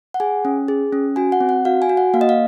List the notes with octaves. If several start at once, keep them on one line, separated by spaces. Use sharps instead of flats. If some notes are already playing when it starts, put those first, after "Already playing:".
F#5
G#4 G#5
C#4
G#4
C#4
F#4 G#5
F#5
C4
F#5
F#4 F5
G#5
F#4
F#5
A#3 F5
D#5
F5